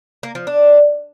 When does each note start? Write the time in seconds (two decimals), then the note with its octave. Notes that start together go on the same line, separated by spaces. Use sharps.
0.23 A#3
0.35 F3
0.47 D4